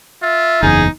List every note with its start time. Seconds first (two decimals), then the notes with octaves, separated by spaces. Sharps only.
0.22 F4 E5
0.63 F#1 E2 D#4 G#4